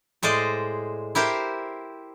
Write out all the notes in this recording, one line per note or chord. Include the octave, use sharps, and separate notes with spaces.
A2 G#3 C5 D5 D#5
E4 G4 A#4 C5